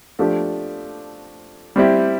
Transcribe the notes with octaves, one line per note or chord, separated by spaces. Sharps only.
F3 A3 D4 G4
G3 C4 E4 G4